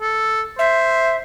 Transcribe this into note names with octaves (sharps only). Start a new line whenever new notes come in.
A4
C5 E5